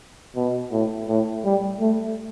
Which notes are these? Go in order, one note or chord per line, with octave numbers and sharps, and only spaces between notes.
B2
A2
A2
G3
A3